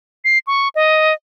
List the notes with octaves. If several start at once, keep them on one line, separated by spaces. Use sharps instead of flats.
C7
C#6
D#5